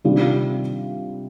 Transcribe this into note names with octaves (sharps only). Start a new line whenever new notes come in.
C3 D#3 G3 D4 F4